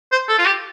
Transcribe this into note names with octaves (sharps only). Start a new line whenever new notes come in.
C5
A4
F4
G4